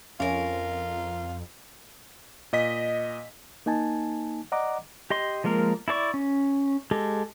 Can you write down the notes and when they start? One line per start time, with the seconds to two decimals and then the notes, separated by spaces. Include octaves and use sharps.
0.20 F2 C#4 F4 A#4 F5
2.53 A#2 D#5 B6
3.66 A#3 D#4 G#5 A5
4.52 D5 D#5 F#5 A#5 D6
5.10 G4 D#5 C6
5.44 F3 G#3 A#3 A#4
5.88 E4 G#4 D5 C#6
6.14 C#4
6.91 G#3 G4 A4